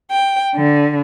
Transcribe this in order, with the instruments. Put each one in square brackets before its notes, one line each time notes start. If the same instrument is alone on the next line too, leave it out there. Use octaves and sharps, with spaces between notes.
[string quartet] G5
D3